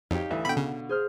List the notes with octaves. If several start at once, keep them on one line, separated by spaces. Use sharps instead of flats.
F2 D#4 G4 C#5 F5
D2 E3 E5
B2 D3 G5 B5
C#3
G#4 C5 F6